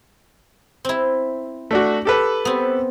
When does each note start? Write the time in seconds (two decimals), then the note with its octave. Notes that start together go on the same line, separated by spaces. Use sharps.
0.85 C4 E4
1.71 A3 D4 F#4
2.05 G4 A4 B4
2.45 B3 C4